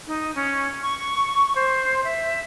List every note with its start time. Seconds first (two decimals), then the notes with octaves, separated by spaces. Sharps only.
0.07 D#4
0.35 C#4
0.82 C#6
1.56 C5
2.04 E5